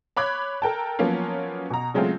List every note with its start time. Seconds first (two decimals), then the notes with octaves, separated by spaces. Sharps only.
0.17 C#5 B5 D6 F#6 G#6
0.62 A4 A#4 G5 A5
0.99 F3 F#3 A#3 B3 C#4 F4
1.70 B2 A#5
1.94 C#3 F#3 G#3 A3 C4 F4